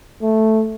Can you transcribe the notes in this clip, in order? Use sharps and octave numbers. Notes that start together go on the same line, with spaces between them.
A3